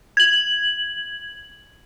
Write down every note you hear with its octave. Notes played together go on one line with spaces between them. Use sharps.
G#6 F#7